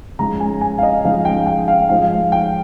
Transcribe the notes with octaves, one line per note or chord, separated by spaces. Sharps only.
C#3 F3 G#3 D#4 A#5
G#5
G#5
F5
D#5
C#3 F3 G#3 D#4 F5
G5
G5
F5
F3 G#3 D#4 F5
G5